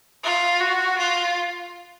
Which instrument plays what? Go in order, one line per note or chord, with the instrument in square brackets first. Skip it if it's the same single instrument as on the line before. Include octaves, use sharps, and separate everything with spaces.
[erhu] F4
F#4
F4